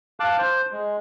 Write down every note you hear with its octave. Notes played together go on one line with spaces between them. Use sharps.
F5 A5 D6 F#6
C5
G#3